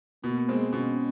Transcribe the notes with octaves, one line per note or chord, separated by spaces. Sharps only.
B2 A#3
G#3 C4
B2 C#4